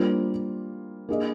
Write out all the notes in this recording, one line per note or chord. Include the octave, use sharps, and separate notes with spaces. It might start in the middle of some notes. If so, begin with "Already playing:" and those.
Already playing: G3 A#3 D4 F4 C5
A#3 D4 G#4 D#5